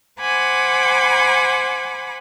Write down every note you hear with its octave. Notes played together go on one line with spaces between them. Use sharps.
C5 F#5 G#5 B5 D6